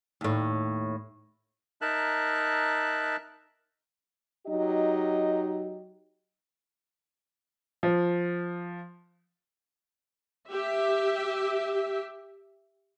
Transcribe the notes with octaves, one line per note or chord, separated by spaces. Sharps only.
D#2 A2
D#4 A#4 E5 A5 F#6
F#3 D#4 G4 D#5
F3
G4 E5